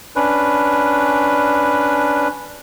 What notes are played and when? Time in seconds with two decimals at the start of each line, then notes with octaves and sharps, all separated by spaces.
0.16 C#4 D4 B4